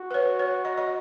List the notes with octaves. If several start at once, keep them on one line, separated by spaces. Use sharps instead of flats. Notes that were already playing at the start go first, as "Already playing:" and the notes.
Already playing: F#4
B4
C#5
C#5
D#5
D#5